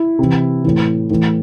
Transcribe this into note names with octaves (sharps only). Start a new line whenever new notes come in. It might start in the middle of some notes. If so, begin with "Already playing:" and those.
Already playing: E4
C3 E3
A2 E3
A2 E3